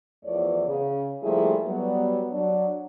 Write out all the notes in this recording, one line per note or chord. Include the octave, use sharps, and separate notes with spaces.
E2 E3 F3 A3 C#5 D5
C#3
F3 G3 A3 A#3 E4 G#4
F#3 G3 B3
F#3 D4